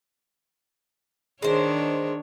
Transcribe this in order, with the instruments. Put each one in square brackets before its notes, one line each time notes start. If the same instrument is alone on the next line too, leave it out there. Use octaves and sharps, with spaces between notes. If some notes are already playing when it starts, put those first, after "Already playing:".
[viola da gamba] D#3 D4 C#5 [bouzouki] G#3 C5